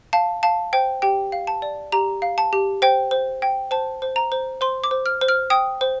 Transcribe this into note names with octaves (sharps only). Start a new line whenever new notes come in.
F5 A5
F5 A5
C5 G5
G4 G5
F5
A5
D5
G4 A#5
F5
A5
G4
C5 G5
C5
G5
C5 A5
C5
A#5
C5
C5 C6
D6
C5
F6
C5
F6
G5 D#6
C5